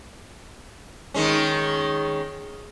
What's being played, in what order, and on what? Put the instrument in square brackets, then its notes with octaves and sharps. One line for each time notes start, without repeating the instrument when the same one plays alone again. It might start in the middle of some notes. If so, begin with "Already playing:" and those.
[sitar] D#3 G#3 C#4